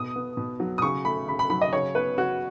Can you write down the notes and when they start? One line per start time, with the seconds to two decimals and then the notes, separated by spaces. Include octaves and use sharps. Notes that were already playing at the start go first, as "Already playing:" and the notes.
Already playing: B2 D#6
0.16 B3
0.37 B2
0.60 F#3
0.78 D#6
0.82 C#3 C#6
1.05 A3 B5
1.28 C#3 B5
1.39 B5
1.50 F#3 B5
1.61 D#5
1.73 C#3 C#5
1.95 B3 B4
2.18 C#3 F#4